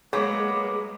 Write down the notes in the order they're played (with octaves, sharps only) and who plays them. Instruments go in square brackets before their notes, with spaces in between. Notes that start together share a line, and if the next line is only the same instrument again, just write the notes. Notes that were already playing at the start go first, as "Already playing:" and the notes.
[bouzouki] F#3 A#3 B3 [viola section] G#3 [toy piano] G#4 [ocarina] D6